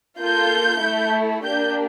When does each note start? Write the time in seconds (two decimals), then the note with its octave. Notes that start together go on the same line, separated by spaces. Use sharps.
0.20 A#3 F4 A4 G6
0.82 A3 E4 A4
1.44 A#3 D4 G4 G6